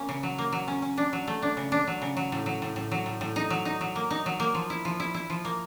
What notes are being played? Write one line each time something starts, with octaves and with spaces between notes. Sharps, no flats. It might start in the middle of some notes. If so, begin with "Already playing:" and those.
Already playing: A#3 C#4
C#3
F#3
A#3
F#3
C#4
C#4
D4
F#3
A3
D4
C#3
D4
F#3
C#3
F#3
A2
F#3
A2
A2
F#3
A2
A2
D#4
F#3
D#4
F#3
A#3
D#4
F#3
A#3
F3
E4
F3
E4
E4
F3
A#3